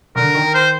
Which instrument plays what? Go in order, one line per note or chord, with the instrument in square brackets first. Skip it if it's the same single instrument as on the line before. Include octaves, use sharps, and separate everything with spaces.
[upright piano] D3 [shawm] A#4
[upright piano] D#3
[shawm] C5